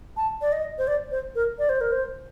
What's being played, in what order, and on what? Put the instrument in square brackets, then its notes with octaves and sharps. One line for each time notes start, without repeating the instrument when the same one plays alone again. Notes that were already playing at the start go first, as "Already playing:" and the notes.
[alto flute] A5
D5
D#5
C5
D5
C5
A#4
D5
C5
A#4
C5